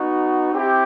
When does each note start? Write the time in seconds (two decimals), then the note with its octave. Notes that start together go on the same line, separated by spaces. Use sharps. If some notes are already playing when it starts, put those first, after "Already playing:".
Already playing: B3 D#4 F#4
0.53 C4 E4 G4